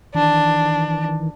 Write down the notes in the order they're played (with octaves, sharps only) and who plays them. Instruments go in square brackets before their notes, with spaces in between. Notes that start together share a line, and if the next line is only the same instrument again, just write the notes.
[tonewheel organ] D#3 E3 [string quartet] D4